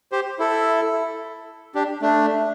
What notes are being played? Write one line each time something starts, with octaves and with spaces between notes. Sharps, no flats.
G4 C5
E4 A4
D4 G4
A3 D4